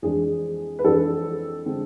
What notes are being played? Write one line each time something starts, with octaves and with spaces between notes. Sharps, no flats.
F2 E3 G#3 D4 G#4
B4
F2 E3 G#3 D4 A4
D3 G#3 C4